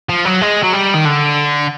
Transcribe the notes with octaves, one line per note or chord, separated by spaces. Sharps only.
F3
F#3
G#3
F#3
G3
D#3
D3